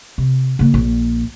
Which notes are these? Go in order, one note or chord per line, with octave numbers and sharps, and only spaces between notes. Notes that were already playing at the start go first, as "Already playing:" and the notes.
C3
C#3 A#3
A#1